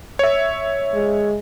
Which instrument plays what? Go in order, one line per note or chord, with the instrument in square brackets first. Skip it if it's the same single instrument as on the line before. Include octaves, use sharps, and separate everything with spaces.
[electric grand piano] C#5 E5
[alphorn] G#3